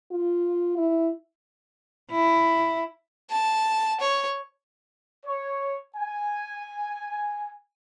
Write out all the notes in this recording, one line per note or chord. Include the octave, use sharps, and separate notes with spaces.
F4
E4
E4
A5
C#5
C#5
G#5